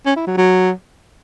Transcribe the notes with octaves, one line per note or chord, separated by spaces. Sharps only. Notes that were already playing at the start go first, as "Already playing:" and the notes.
C#4
E4
F#3
F#3